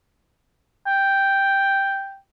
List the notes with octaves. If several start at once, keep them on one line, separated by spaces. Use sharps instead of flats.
G5